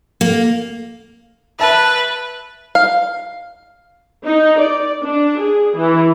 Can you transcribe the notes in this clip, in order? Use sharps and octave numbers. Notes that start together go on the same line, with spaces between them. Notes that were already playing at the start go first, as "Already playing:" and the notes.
A#3
B4 E5 A5
F5
D#4
D5
D4
G#4
E3